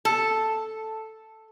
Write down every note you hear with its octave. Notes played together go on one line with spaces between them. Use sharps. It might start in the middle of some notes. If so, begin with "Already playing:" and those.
A4